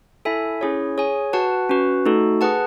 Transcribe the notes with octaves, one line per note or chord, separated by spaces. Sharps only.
E4 A4 E5 G#5
C#4 E4 G#4 C#5
G#4 C#5 G#5
F#4 B4 F#5 A5
C#4 F#4 B4
A3 D#4 F#4 A4
G#4 B4 F#5 A5